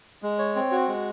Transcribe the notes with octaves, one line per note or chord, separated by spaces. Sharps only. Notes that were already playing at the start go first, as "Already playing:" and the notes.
G#3
C#5
C4
F#4
G#3